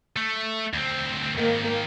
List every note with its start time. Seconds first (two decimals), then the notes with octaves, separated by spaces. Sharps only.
0.16 A3
0.73 D2 C4
1.37 G#2 D#3 A#3